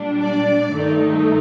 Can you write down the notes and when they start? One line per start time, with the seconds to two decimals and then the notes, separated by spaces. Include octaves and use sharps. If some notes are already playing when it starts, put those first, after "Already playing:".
Already playing: A#2 G3 D4
0.21 D5
0.71 G2 D#3 A3 D#4